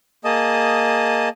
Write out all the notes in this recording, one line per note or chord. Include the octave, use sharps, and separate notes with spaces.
A#3 G#4 D#5 A5 D#6